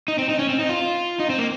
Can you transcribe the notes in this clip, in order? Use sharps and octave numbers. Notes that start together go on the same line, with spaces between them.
D#4
C4
D#4
C#4
C4
D#4
F4
D#4
C4
A#3